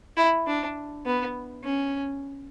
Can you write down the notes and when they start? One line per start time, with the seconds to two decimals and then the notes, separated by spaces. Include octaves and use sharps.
0.17 E4
0.47 D4
1.06 B3
1.64 C#4